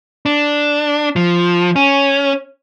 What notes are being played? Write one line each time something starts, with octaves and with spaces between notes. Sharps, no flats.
D4
F3
C#4